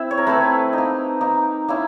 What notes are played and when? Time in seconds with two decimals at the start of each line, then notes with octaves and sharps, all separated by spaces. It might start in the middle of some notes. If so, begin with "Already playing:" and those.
Already playing: C4 E4 E5
0.11 C#5
0.18 A#4
0.27 A3 C4 E4 B4
0.73 A#3 D#4
1.21 A#3 D#4
1.68 A#3 C#4 E4